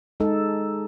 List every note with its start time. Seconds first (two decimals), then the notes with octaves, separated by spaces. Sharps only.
0.20 G#3 D#4 A4